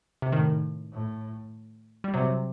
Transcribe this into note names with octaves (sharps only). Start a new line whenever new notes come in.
C3
A2 D#3
A2
G3
C3 F#3